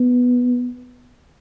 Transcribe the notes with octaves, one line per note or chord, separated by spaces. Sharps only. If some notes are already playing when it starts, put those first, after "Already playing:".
Already playing: B3